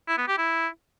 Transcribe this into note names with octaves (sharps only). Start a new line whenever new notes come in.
E4
B3
G4
E4